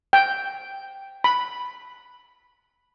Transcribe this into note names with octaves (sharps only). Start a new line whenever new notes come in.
G5
B5